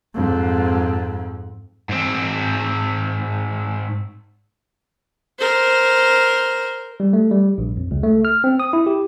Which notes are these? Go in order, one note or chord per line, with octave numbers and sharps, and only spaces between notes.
F2 G#2
G#2 C4
A#4 C5
G3
A3
G3
A#1
F2
C#2
A3
F6
C4
D#6
E4
G4